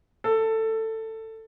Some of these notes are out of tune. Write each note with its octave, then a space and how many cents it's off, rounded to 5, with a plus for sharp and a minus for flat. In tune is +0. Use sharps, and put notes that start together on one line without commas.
A4 +15